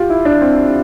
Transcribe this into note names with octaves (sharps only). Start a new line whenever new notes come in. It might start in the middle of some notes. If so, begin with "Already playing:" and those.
Already playing: F4 G4
E4
D4
C4